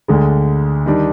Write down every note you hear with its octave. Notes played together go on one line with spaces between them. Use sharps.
D2 D3 G#3
D#3 G3 D4